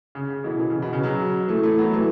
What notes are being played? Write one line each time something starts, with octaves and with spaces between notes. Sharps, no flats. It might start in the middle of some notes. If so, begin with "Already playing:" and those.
C#3
C#3
B2 E3
B2 E3
C#3
B2
C#3
C#3 F#3
E3 A3
E3 A3
F#3 B3
E3 A3